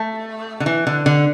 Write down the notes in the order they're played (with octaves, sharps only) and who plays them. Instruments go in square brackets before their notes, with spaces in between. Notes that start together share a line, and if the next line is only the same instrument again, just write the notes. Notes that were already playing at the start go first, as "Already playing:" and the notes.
Already playing: [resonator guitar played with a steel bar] A3
D3
E3
D3
D3